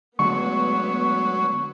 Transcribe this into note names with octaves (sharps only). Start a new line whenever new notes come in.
D3 F#3 G#3 A3 B3 C#6